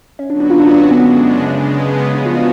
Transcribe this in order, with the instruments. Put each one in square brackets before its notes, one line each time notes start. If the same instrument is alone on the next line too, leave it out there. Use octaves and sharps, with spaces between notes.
[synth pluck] C#4
[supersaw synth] D3 F#3 B3 F#4 [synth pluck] D4
[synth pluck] D4
F4
D4
D4
C#4
[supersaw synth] F#2 C#3 G#3 D4 [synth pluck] B3
[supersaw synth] C#3 G#3 B3
[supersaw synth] A2 F3 B3 F#4 [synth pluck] C#4
[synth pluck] F4
D4